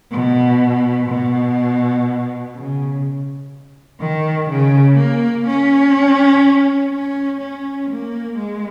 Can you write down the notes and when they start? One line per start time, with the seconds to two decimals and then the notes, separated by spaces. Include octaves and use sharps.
0.11 B2
1.09 B2
2.55 C#3
4.00 D#3
4.49 C#3
4.97 A#3
5.47 C#4
6.92 C#4
7.40 C#4
7.90 A#3
8.37 G#3